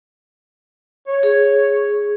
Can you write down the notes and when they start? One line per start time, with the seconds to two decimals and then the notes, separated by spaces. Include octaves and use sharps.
1.08 C#5
1.23 G#4